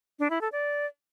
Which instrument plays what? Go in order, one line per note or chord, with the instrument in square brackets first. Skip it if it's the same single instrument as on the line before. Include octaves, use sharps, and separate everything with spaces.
[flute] D4
E4
A4
D5